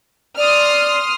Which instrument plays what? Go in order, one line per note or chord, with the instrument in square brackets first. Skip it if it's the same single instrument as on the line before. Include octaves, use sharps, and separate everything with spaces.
[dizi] D5 [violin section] C6 D#6 F6